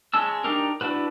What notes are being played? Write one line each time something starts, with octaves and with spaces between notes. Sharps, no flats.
G#3 C#4 A5 E6
D4 D#4 G4 A#4
D4 E4 F#4 B4